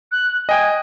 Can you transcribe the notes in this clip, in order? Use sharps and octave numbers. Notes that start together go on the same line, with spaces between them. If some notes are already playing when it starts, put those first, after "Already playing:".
F#6
D#5 G5 G#5 D#6